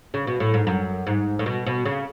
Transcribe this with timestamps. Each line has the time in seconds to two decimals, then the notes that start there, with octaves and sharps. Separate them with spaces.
0.14 C#3
0.27 B2
0.40 A2
0.54 G#2
0.67 F#2
1.07 G#2
1.39 A2
1.46 B2
1.66 B2
1.85 C#3